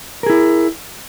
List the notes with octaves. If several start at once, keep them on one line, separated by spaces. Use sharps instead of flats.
E4 G#4 A#4